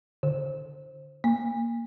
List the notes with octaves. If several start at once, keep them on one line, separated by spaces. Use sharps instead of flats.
D3
A#3